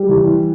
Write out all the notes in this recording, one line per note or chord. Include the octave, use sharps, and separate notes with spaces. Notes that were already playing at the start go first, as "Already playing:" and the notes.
Already playing: G3
E3